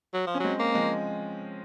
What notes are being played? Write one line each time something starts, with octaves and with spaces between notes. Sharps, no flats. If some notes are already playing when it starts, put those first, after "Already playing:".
F#3
F3
C#4
F#3 G#3 C4
A#3
F3 G#3